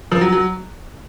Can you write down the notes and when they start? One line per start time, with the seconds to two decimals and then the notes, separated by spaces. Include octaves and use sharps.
0.12 F3
0.21 F#3
0.32 F#3